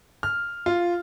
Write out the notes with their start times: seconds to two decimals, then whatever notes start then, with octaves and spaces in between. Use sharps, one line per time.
0.23 F6
0.66 F4